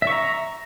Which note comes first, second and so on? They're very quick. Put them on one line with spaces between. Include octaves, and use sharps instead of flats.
E5 C#6 A#5